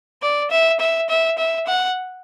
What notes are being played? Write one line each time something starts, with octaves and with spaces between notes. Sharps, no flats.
D5
E5
E5
E5
E5
F#5